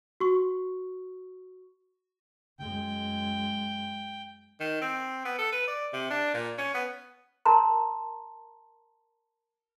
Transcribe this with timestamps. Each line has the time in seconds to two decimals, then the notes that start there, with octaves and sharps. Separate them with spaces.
0.20 F#4 C#6
2.59 F#2 G#3 G5
4.60 D#3
4.81 C4
5.25 B3
5.38 A4
5.52 B4
5.67 D5
5.93 C3
6.10 D4
6.34 A#2
6.58 C#4
6.74 B3
7.45 A#4 A5 A#5 C6